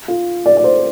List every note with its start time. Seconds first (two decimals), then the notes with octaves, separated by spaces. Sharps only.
0.08 F4
0.46 D5
0.57 D5
0.64 C5